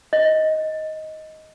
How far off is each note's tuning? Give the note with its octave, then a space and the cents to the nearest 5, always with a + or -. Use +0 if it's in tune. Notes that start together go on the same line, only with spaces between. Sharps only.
D#5 +10